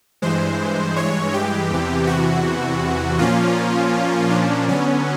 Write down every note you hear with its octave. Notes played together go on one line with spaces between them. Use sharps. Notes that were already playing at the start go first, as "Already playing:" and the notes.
G2 E3 G#3 C5
C#5
G4
E2 C3 E3
F#4
A#2 F3 A#3 C#4 F4
D4
D3 F#3 B3 C#4